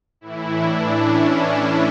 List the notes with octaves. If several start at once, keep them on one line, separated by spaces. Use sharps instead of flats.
A2 E3 E4
D4
C#4